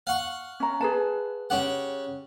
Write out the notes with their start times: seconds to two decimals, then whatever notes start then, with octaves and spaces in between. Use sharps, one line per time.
0.07 F5 F#5 C#6
0.60 C#4 A#5
0.81 G#4 B4 A5
1.50 C#3 G4 F#5